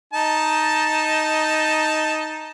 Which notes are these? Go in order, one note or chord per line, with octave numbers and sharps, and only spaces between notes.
D#4 A5